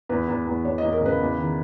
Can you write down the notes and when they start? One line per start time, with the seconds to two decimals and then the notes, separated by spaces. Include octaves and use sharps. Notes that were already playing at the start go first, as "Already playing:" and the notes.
0.09 E2 B4
0.28 E2
0.46 E2
0.64 E2 C#5
0.78 E2 D#5
0.92 A#4
1.01 C#3 B4
1.20 E2
1.39 D#3